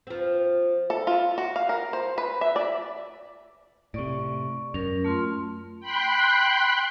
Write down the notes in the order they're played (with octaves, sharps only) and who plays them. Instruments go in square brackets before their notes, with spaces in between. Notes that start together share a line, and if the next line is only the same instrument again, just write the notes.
[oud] F3 C4
[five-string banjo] A4
F4
F#4
F5
A#4
C5
B4
E5
D5
[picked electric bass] A2 C3 [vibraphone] D5 C#6
[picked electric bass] F#2 [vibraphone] C#4 A#4
[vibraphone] A3 F4 C6
[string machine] G5 B5 C6 F#6